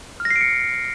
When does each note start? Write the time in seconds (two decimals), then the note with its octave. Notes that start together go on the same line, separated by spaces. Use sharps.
0.20 F6
0.25 A#6
0.30 C7
0.36 D7
0.41 C#7